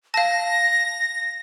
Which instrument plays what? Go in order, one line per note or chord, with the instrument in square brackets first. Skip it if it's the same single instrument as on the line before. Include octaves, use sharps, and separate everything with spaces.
[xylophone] F5 A5 [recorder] A#6